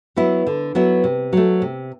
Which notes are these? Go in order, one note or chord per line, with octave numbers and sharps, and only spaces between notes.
F#3 B3 E4
D3
F#3 B3 E4
C3
F#3 A3
C3